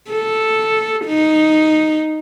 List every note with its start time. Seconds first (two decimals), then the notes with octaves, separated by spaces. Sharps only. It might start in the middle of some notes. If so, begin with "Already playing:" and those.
0.11 A4
1.06 D#4